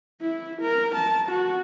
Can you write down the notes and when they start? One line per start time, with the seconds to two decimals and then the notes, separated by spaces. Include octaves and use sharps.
0.21 E4
0.62 A#4
0.95 A5
1.29 F#4